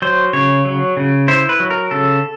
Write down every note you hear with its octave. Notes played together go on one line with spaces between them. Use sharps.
F#3 C5
C#3 C#5
F#3
C#3
E4 C5
B4
F#3
A#4
C#3 A4